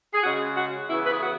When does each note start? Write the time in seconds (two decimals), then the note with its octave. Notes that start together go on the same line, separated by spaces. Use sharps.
0.14 G#4
0.24 C#3 G#3 C#4 F#4
0.56 F#4
0.88 C#3 E3 B3 E4
1.06 B4
1.12 G#4
1.21 F#4